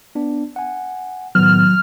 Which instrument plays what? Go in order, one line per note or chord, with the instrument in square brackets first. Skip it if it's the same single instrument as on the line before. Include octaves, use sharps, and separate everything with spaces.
[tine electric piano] B3 D4
F#5 G#5
[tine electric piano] A2 D#3 B3 [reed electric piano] F#3 [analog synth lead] F6